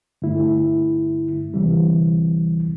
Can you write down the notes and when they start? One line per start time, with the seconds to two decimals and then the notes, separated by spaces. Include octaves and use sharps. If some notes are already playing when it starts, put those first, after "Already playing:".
0.22 G2 D3 A3 E4
1.54 D2 C3 E3 G3